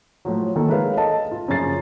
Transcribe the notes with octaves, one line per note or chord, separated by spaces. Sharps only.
A2 F3 F#3
D#3 A#3 A4
G#3 A#4 B4 C#5 E5 F5
A4 D#5 A5
F4
F#2 C#3 F3 A6 C7